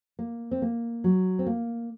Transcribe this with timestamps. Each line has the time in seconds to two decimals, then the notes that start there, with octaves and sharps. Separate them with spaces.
0.19 A#3
0.51 C4
0.62 A#3
1.04 F#3
1.39 C4
1.47 A#3